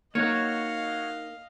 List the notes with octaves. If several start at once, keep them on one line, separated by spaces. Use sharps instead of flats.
A#3 D#4 F#4 C#5 D#5 F5